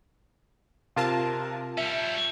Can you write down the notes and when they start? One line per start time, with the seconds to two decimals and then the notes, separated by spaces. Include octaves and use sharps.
0.96 C3 F4 A#4 A5
1.78 G3 C#4 E5